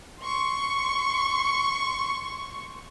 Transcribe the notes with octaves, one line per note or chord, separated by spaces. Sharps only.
C6 C#6